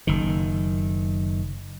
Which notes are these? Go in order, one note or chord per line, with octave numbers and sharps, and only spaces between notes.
F#1 D#3